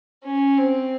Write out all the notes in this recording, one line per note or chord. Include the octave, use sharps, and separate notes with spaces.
C#4
C4